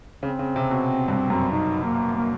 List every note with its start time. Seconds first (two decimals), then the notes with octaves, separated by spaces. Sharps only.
0.23 C#3 C4
0.39 C#3
0.56 C3
0.71 B2
1.08 G2
1.30 F#2
1.52 D#4
1.83 A#3
2.16 A#3